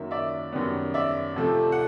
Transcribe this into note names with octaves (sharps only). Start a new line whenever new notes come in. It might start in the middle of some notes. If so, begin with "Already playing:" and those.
Already playing: F#2 D#3 F#3 A#3 E5
D5 E5
F#2 D#3 G3 B3
D5 E5
C3 F3 A3 C4
F#5